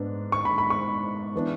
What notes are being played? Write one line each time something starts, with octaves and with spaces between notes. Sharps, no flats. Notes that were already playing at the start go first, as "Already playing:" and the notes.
Already playing: G#2 B3 D4
C#6
B5
B5
C#6
E3 B3 D4